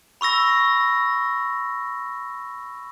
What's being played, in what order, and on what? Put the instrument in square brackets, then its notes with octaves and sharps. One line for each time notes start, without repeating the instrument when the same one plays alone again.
[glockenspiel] B5 C#6 E6 A#6